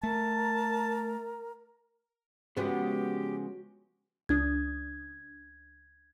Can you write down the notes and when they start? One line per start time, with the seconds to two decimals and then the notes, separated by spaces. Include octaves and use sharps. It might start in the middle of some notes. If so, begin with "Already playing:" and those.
0.03 A3 A#4 A5
2.57 C#3 F3 G#3 B3 C#4 F#4 G4
4.29 C#2 D4 D#6 G#6